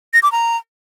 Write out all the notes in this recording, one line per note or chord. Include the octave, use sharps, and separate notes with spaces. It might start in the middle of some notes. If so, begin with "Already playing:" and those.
A#6
D6
A#5